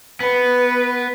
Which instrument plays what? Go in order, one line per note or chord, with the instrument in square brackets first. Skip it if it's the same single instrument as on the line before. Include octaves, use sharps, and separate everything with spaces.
[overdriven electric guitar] B3 [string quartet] B4